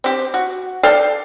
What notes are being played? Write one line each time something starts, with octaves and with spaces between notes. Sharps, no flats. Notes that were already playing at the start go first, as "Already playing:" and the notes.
C4 G4
F#4
A4 D5 F5 G5